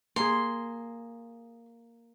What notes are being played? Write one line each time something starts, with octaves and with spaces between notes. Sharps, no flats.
A#3 G#4 C6